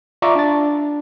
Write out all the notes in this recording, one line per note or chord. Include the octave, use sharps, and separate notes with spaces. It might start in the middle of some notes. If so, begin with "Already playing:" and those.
F4 D5 E5 A#5 C#6 D6
D4 A6